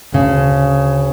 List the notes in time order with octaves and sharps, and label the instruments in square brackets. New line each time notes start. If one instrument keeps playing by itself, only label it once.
[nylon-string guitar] D2 C#3